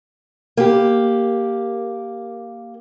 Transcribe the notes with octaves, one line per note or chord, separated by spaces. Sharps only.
A#3 G4